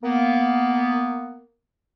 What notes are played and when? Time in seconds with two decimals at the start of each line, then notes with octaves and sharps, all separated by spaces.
0.03 A#3 B3